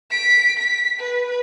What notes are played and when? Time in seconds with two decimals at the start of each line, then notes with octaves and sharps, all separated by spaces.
0.11 B6 D7
0.58 B6
0.99 B4